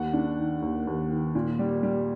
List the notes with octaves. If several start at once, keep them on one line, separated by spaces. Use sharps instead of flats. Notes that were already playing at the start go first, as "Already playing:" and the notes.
Already playing: D#2 F#5
D4
D#3
D#2
D#2
D#3
A#2
G3
G3